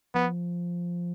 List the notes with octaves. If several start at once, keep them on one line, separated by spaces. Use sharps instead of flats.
F3 B3